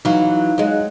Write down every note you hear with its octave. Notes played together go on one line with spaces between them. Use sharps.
E3 F#3 D#4 F5
F#3 G#3